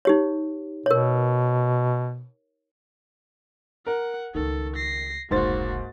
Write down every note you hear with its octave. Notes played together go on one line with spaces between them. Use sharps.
D#4 G4 C#5
B2 A#4 C#5
A#4 F#5
C#2 D#3 A3 A4
A#6 C7
F1 C#2 G#2 A#3 F#4 C5 A6